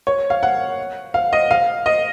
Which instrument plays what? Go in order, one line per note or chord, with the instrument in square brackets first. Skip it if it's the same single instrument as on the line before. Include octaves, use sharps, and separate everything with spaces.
[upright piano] C#5
F5
F#5
F5
D#5
F5
D#5